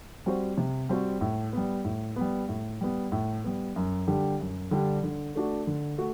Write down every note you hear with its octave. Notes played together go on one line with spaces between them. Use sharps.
G3 C4 F#4 C5
C3
G3 C4 F#4 C5
A2
G3 B3
A2
G3 B3
A2
G3 B3
A2
G3 B3
F#2
D3 G3 D4 G4
F#2
D3 G3 D4 G4
D3
A3 D4 F#4
D3
A3 F#4